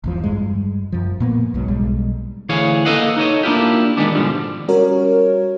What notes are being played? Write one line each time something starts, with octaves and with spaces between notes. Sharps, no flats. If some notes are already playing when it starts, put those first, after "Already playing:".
G#1 E2 F3
G2 G3 G#3
F#2 F3
A#2 A#3 B3
B1 G#2 F#3
B1 G3 G#3
D2 E3 G#4 C#5 F5
A#3 A4 B4 D#5 F5 F#5
D#4 A4 C#5 D#5
A#3 D4 E4 F4 G4
D#3 G3 G#3 B3 D4
G#2 B2 D3 F3 G3
G3 C#4 F#4 A#4 C#5